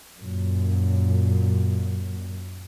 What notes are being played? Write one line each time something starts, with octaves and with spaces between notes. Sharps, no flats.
F#2 A#2